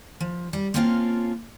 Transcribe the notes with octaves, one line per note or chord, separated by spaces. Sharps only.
F3
G3
A#3 C4 C#4 F4 A4 F5